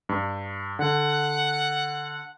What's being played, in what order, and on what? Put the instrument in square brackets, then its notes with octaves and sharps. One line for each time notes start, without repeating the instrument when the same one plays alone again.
[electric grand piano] G2
[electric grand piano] D3 [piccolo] F#5